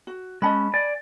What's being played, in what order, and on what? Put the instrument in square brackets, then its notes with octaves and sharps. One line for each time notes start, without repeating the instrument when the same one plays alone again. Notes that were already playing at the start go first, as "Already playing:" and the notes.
[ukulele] F#4
[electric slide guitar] G#3 C#4 [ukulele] D#5 A5 B5
[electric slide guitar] D5 G#5